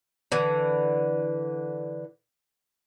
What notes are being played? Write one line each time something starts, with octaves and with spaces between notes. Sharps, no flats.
D3 E3